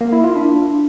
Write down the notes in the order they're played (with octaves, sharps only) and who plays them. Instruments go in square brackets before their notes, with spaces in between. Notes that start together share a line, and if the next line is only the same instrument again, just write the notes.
[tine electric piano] A#3
E4
F4
D4